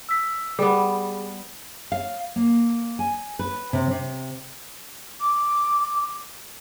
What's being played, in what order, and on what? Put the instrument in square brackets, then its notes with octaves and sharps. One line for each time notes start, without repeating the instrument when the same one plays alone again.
[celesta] E6 B6
[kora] G3 B3 [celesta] G#4
[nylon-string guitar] F5
A#3
G#5
B4
C3
C3
[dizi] D6